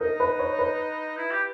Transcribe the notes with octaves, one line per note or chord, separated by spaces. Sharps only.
D#4 A#4
B4
C#5
B4
E4
G4